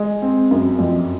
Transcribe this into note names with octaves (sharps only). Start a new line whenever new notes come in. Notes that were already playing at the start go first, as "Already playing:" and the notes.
Already playing: G#3
C4
F#2
F2